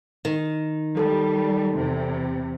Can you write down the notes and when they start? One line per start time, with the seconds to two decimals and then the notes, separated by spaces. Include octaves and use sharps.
0.25 D#3
0.97 G3 A4 A5
1.73 E2 C3